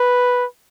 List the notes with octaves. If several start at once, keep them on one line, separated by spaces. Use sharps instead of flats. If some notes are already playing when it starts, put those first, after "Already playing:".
Already playing: B4